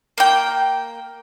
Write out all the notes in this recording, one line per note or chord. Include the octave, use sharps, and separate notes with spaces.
A#3 G5